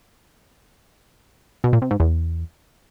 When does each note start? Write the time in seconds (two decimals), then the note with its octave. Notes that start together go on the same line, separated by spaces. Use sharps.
1.64 B2
1.73 A#2
1.82 C3
1.91 G#2
2.00 E2